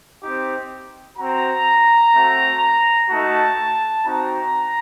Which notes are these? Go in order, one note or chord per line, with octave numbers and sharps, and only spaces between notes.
C4 D#4 G4
C4 F#4 A#5
A3 C4 F#4
A3 D#4 F#4 A5
C4 D#4 F#4 A#5